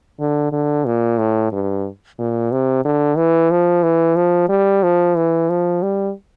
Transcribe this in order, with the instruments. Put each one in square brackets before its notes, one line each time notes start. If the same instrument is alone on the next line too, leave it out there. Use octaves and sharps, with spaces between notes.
[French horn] D3
D3
A#2
A2
G2
A#2
C3
D3
E3
F3
E3
F3
G3
F3
E3
F3
G3